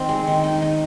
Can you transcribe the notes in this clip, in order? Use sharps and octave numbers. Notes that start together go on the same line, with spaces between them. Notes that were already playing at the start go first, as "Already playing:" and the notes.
Already playing: D#3 C4
G#3
D#3
D#4
D#4